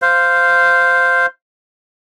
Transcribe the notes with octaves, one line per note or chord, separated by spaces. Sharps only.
C5 F5